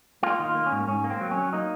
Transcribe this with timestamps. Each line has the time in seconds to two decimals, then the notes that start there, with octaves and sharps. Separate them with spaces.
0.23 A#3 F4
0.39 D#3
0.45 F4
0.55 A#3
0.66 C#4
0.71 G#2
0.88 G#2 C#4
1.04 A#3
1.10 C4
1.21 F#3
1.31 C#4
1.37 F#3
1.53 A#3 D#4